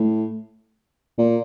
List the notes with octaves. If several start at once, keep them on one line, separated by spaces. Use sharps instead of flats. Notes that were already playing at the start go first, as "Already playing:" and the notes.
Already playing: A2
A#2